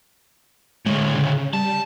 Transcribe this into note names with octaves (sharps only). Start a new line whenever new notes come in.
D2 A2 G#3
C#3
G3 A5